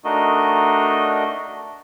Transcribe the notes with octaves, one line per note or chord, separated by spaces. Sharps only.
A3 D4 D#4 F#4 A#4 D#5